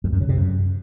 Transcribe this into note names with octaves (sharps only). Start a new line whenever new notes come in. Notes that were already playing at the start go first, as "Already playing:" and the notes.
F2
F#2
C#3
C3
F#2